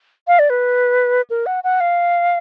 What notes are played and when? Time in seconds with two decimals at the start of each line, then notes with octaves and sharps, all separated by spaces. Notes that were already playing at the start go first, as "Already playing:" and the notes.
0.28 F5
0.39 D5
0.50 B4
1.30 A#4
1.46 F#5
1.64 F#5
1.80 F5